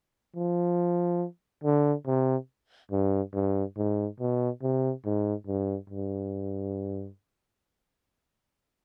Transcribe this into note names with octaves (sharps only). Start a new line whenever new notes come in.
F3
D3
C3
G2
G2
G#2
B2
C3
G#2
G2
G2